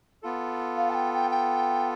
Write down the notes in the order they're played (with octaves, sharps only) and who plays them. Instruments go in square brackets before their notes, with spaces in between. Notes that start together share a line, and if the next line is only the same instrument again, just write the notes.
[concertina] B3 F4 A4
[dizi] F5
A5
G5
G5
G5